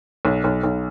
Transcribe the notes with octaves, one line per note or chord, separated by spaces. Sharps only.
B1
B1
B1